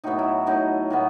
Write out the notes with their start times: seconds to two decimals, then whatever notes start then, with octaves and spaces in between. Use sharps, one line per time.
0.04 A2 F#3 B3 D#4
0.19 E4
0.46 A2 F#3 B3 D#4
0.90 A2 F#3 B3